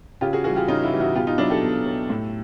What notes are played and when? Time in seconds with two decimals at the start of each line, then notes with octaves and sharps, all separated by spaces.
0.21 C#3 F4 G4
0.33 F#4 G#4
0.44 E3 F#4 G#4
0.49 G3
0.56 F4 G4
0.68 C#3 D#4 F4
0.83 E4 F#4
0.92 E3 G3
1.00 E4 F#4
1.15 B2 F4 G4
1.27 D#4 F4
1.38 F#3 D4 E4
1.50 G4 A4
1.62 B2
1.86 F#3
2.10 A2